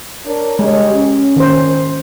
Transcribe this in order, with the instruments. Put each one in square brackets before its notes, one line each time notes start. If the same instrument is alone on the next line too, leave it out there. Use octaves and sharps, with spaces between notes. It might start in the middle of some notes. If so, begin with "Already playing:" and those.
[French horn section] D4 A#4 C#5
[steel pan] G#3 [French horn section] G4 C#5
[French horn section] C#4
[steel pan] D#3 C5